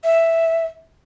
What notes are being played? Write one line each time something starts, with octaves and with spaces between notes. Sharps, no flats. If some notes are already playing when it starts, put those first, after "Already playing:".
E5